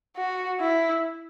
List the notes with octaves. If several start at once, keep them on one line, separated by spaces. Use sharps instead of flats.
F#4
E4